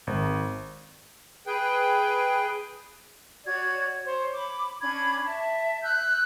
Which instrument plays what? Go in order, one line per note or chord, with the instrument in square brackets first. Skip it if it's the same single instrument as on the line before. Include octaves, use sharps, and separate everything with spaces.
[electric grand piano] G#1
[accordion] G#4 B4 G5
[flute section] F#4 C#5 D5 G#6
C5 C#5
B5 D6
C#4 D4 B5 G#6
E5 A5
E6 F#6 G6